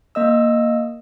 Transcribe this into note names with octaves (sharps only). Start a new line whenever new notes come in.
A#3 D#5 E6